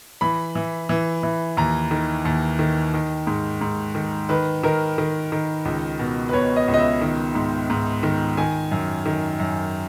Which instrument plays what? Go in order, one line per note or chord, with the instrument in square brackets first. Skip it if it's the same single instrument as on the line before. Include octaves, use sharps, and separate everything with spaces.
[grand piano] E3 B5
E3
E3
E3
D#2 A#5
D#3
D#2
D#3
D#3
G#2
G#2
D#3
D#3 B4
D#3 A#4
D#3
D#3
C#2
B2
B4
B2 C#5
D#5
C#2
D#5
E5
D#3
G#2
G#2
D#3
D#3 G#5
F#2
D#3
F#2